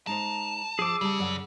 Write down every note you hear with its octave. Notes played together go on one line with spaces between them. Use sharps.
G#3 D#4 C5 A5 A#5
F3 G#4 C5 D6 E6
C#3 G3 A5
F#2 D5 F#5